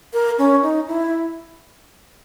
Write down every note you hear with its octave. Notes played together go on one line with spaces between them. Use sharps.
A#4
C#4
D#4
E4